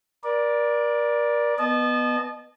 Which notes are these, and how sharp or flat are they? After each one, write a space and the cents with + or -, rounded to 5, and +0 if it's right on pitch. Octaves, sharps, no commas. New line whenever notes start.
A#4 +35 D5 +0
B3 +0 D#5 -30 A5 -30